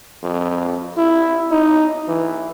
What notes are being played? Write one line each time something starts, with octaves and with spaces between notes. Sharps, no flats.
F2
E4
D#4
E3